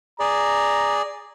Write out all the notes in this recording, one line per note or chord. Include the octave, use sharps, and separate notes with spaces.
G#4 D5 A#5